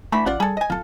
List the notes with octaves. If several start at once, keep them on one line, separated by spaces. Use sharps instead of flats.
D3 E3 A3 B5
A1 F4 D5 F#5
G3 G#4 A4
D#5 G#5
D1 F4 A4